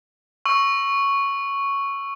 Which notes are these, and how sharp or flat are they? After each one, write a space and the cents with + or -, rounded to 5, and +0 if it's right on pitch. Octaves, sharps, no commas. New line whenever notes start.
C#6 +0 E6 +10